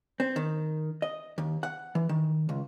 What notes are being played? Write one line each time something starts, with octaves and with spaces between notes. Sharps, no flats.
C4
D#3
D#5
D#2
F#5
E3
D#3
C#2